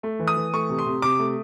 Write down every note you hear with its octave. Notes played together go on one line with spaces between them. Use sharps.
A3
E3
D#6
E3
A3 C#6
C3
C6
C3
C3 D6
A3